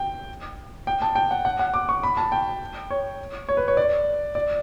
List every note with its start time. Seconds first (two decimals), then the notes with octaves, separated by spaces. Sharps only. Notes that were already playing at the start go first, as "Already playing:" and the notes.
Already playing: G5
0.87 G5
1.02 A5
1.15 G5
1.31 F#5
1.45 F#5
1.59 F#5
1.74 D6
1.89 C#6
2.03 B5
2.17 A5
2.32 G5
2.90 C#5
3.49 C#5
3.57 B4
3.68 C#5
3.77 D5
4.35 D5